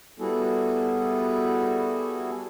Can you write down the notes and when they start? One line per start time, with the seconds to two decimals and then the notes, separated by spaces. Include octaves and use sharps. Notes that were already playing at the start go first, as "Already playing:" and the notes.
0.19 G3 B3 E4 F#4 G#4 A4